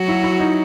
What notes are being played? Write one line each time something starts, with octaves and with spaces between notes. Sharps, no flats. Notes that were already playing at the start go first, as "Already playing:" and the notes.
Already playing: F#3 F#4
E4
E4
D#4